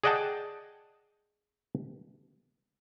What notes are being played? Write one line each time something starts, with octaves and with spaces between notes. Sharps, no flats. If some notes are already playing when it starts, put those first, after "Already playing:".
G#4 D5 D#5 F#5 G5 A5